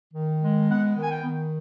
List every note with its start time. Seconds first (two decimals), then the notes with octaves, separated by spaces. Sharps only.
0.14 D#3
0.40 G#3
0.69 B3 F#5
0.96 D#3
1.02 G#5
1.10 G5
1.24 D#3